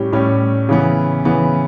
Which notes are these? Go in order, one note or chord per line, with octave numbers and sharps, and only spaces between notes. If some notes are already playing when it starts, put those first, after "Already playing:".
Already playing: A2 G3 C#4 G4
A2 G3 C#4 G4
C#3 E3 B3
C#3 E3 B3